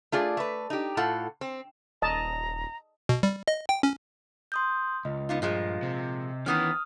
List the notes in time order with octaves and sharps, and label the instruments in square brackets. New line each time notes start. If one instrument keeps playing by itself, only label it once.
[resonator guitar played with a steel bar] A3 F4 G#4 D5
A3 B4
D#4 G4
A2 F4 A4 F#5
C4
[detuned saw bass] D#1 [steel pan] D#5 A5 [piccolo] A#5
[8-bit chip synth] B2
G3
D#5
G5
C#4
[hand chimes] C6 D#6 G6
[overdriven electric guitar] C#2 [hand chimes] D#5
[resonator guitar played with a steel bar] B3 D#4 F4
[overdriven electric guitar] G2 [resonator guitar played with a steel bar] A#2 F3 G#3
[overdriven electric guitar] C3
[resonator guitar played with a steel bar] D#3 B3 C#4 [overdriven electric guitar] E3 [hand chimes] D#6 F6